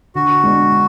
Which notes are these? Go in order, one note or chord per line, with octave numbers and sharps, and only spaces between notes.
D3 F#4
G#3 B3 D4